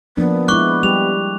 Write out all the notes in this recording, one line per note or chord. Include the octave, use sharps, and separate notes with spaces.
F3 A#3 B3 D4
G#3 E4 C#6 D6 F#6
G3 G4 F7